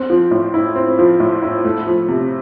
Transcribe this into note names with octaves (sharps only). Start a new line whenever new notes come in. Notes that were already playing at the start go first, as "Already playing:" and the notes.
Already playing: C4
F3
A2
E4
C4
F3
A2
E4
A3
F3
C3